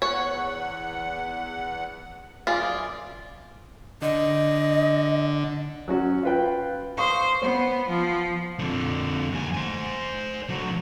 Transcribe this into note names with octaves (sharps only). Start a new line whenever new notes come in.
E2 C#5 F#5
F#2 F4 G#4 D5
D3 D#5
F#3 C#4 F#4
F4 B4 G5
C5 F5 C#6 D#6
B3 C5
F3
F2 D3
D#2 G#5
C5 G#5
D3 F#3